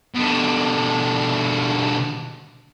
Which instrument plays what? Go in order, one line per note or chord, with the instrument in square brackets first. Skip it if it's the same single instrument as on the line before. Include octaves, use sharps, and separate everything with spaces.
[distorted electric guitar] B2 D3